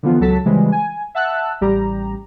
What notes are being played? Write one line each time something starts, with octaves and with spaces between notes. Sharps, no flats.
D3 E3 F3 B3 F4
C#2 F#3 A4 A5 B6
C#3 E3 F3 G3 G#3
G#5
E5 F#5 A5 E6 F#6
A1 G3 G4 A#5